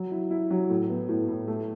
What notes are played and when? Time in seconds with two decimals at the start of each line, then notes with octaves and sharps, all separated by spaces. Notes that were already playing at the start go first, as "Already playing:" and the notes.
Already playing: F#3
0.12 E4
0.31 E4
0.51 F#3
0.70 A2
0.89 B3
1.09 A2
1.28 A2
1.48 A3